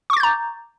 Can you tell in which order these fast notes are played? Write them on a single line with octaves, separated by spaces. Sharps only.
C#6 D6 A6 G6 A#5